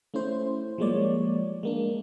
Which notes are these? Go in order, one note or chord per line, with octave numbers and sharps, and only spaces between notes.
A3 C#4 E4 C5
F3 G3 G#3 A#3 C#5 D5
G#3 A#3 D4